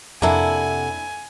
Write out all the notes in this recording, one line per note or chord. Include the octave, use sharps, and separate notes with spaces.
F2 C3 A#3 D4 E4 A4 F#5 G#5